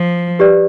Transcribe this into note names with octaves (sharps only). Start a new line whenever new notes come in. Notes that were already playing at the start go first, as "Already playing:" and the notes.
Already playing: F3
G4 B4 D5